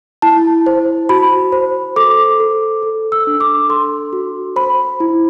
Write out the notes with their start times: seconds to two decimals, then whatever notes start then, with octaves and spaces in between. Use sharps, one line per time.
0.22 E4 A5
0.66 C5
1.09 F#4 B5
1.52 C5
1.96 A4 D6
2.40 A4
2.82 A4
3.12 E6
3.27 D4
3.41 D6
3.69 A4 C6
4.13 F#4
4.56 C5 B5
5.00 E4